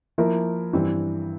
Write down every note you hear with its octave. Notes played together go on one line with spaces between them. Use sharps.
F3 A#3 E4 A#4
G2 E3 G3 C4